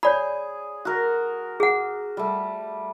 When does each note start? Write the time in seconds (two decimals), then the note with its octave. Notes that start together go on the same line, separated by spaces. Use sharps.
0.03 G#4 C#5 D5 B5
0.85 F#4 A#4
1.60 G#4 F#5
2.17 G3 A3